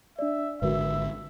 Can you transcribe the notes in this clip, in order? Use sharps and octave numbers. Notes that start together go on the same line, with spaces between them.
D4 D5 E5
G#1 D3 G#3 F#4 A#4 B4 E5